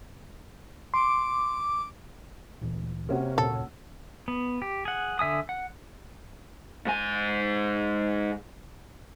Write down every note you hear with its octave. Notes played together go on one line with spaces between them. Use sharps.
C6 D6
D2 A#2 E3
C3 A#3 C#4 F#4
D2 A#2 C#3 A4
B3
G4
G#4 F#5
D3 E5 G#5 D#6
F#5
G#2 G#5